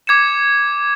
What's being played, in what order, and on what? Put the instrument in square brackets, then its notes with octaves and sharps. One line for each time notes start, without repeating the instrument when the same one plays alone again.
[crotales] D6 G#6 C#7 E7